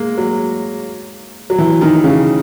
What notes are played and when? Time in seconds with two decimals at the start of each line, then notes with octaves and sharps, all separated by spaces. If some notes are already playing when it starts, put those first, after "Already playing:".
Already playing: G#3 A#3
0.18 F#3
1.50 F#3
1.58 E3
1.81 D#3
2.04 C#3